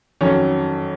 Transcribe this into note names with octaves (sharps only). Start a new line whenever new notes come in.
F2 D#3 F#3 C#4